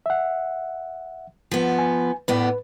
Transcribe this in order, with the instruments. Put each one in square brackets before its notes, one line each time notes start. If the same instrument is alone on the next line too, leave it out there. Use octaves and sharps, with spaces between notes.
[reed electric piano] E5 F#5
[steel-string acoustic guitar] F3 B3
[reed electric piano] G#5
[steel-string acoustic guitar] A2 B3 D5 [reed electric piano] B4